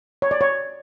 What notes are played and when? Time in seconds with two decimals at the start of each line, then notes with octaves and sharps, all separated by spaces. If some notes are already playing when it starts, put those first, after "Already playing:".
0.22 C#5
0.31 D5
0.41 C#5